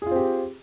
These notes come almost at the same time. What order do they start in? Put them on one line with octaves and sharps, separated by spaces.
G#4 F4 C4 G4